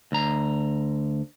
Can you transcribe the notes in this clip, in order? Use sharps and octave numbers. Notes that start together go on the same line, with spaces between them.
D2 A#5